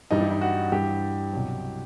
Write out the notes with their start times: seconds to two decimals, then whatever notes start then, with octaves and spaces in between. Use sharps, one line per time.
0.11 G2 E3 G3 D#4
0.21 E4
0.30 D#4
0.41 F#4
0.72 G2 E3 G3 G4
1.33 C2 B2 F#3